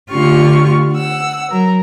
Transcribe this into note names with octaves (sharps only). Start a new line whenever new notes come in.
D3 A3 F4 G4 C#6 F6
F#5 E6
F#3 A#4